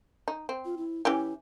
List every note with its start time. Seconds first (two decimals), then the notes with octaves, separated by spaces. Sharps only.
0.28 D#4
0.49 C4
0.65 F4
0.77 E4
1.05 E3 C#4 E4 G4